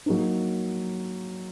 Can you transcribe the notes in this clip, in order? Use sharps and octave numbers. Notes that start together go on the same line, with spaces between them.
F#3 A#3 D#4